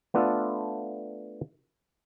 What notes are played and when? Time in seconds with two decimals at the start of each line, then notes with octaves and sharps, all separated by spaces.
0.14 A3 B3 D4 F4 A4